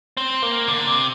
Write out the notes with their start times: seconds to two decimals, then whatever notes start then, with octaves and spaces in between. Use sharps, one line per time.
0.17 C4
0.42 A#3
0.68 D3
0.87 C3